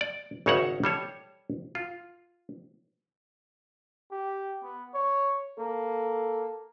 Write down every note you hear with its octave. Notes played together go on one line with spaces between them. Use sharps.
D5
G#1 C#3 D#4 C#5 E5 F#5
G3 A4 C#5
F4
G4
B3
C#5
A#3 A4